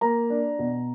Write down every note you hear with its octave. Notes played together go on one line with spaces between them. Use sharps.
A#3 A#5
D4
B2